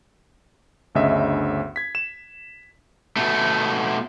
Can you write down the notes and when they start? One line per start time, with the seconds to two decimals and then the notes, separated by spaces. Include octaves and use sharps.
0.95 G1 D2 C#3 D#5 E5
1.76 G#6 B6
1.95 E7
3.16 B2 A3